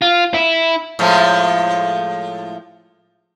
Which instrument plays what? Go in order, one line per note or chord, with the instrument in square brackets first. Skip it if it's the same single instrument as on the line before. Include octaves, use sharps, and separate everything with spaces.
[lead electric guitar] F4
E4
[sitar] A2 F3 G#3